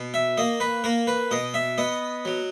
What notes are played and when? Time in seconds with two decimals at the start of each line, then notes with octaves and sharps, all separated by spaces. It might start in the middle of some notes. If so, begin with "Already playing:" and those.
Already playing: B2
0.14 E5
0.38 A#3 D#5
0.60 B4
0.84 A#3 A#4
1.07 B4
1.31 B2 D#5
1.54 E5
1.78 B3 D#5
2.25 F#3